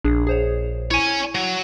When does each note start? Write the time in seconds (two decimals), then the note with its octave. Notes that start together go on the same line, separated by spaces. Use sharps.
0.04 A#1 D4 G#4
0.27 G#4 C5 C#5
0.91 E4 C#5 G#5 C#6 D#7
1.35 F#3